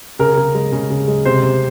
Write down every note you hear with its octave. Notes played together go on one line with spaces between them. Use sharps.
C#3 A#4
C#3
G#3
C#3
C#3
G#3
C3 C5
C3